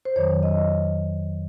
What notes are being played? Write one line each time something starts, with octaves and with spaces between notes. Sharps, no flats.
C5
F2 D#3 F#3 C#5
D#5